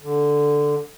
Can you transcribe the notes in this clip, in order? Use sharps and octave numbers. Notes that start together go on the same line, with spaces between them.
D3